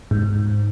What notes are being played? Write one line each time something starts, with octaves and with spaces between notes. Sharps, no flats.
G#2